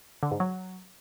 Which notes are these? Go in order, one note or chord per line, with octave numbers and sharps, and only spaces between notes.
D3
G#2
F#3